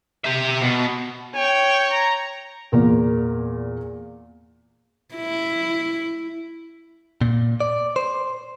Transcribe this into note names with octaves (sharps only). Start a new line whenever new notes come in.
G4 E5
B2
C#5 G5
A#5
E2 A#2 A#4
E4
A#2
D5
C5